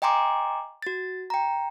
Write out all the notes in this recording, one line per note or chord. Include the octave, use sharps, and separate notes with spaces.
D#5 G5 G#5 A#5 C6 D6
F#4 A6
G5 A#5